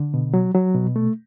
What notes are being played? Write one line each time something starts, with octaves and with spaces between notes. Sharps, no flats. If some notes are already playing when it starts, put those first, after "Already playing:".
Already playing: D3
B2
F#3
F#3
B2
A3